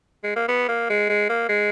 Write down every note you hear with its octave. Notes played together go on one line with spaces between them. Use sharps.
G#3
A#3
B3
A#3
G#3
G#3
A#3
G#3